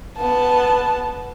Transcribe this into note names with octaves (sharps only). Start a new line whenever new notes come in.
B3 A5